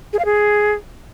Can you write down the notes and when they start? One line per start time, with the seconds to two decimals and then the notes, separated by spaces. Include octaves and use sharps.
0.13 G#4
0.19 F5
0.25 G#4